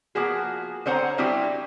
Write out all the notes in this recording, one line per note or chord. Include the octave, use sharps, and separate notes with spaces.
F3 A#3 B3 F#4 G#4
D3 C4 C5 C#5 F#5 A#5
G3 C4 D4 E4 F#4 G4